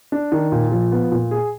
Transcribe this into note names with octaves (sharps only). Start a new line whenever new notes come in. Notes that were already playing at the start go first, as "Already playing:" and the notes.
D4
D#3
A#2
F3
B3
A#2
G#4